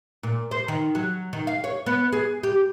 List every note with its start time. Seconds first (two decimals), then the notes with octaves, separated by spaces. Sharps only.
0.23 A#2
0.51 C5
0.68 D#3
0.95 F#3
1.33 D#3
1.47 F5
1.64 C#5
1.86 B3
2.12 G#4
2.43 G4